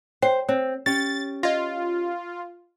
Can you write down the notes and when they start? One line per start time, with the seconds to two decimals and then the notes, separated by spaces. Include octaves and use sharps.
0.22 C5 C#5 G5
0.49 C4 C#5
0.86 C#4 G4 A6
1.43 F4 D#5 A#6